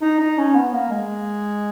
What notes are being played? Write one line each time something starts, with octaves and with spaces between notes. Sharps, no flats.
D#4
D#4
C#4
B3
A#3
G#3